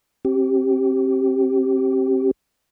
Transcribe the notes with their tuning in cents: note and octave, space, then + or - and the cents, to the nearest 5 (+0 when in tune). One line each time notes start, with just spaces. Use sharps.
C4 +30 G4 -20